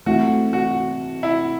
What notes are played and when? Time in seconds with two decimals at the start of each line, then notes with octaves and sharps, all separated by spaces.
0.06 E3 A3 C4 F#4
0.53 F#4
1.23 E4